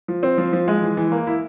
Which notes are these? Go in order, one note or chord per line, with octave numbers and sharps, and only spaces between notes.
F3
C4
F3
F3
G#3
E3
E3
A#3
E4